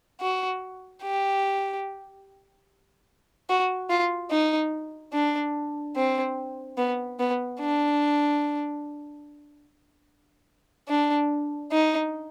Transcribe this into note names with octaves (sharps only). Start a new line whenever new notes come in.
F#4
G4
F#4
F4
D#4
D4
C4
B3
B3
D4
D4
D#4